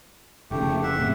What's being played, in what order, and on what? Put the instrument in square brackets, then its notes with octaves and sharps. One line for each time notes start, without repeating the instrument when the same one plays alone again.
[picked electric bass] F1 C#3 [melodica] A3 G4
[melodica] E5 F#5
[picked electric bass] A2 C3